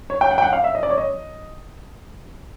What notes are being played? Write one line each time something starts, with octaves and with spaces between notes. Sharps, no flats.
C#5
G5
F#5
G5
F#5
F5
E5
D#5
D5
C#5
D#5